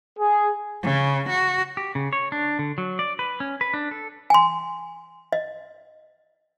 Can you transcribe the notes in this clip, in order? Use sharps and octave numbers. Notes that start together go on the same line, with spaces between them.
G#4
C#3
F#4
G4
C#3
C#5
D4
D3
F#3
D5
B4
C#4
B4
D4
A4
G#5 C6
D#5